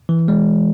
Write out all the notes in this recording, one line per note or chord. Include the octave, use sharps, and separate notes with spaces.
E3
G#3